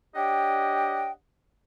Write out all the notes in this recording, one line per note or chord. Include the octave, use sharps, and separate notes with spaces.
D4 G4 C#5 D#5 F#5 G5